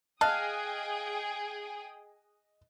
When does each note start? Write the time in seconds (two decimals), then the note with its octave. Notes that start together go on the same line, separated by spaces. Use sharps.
0.21 G#4 D#5 F5 G5 A5 D#6 F#6